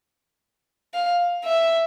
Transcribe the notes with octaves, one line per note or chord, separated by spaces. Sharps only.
F5
E5